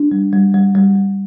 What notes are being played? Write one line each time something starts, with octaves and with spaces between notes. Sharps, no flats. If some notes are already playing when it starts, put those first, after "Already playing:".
Already playing: D4
G3
G3
G3
G3
G3